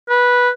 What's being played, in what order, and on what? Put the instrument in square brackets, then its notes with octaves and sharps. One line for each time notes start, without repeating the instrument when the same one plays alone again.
[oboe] B4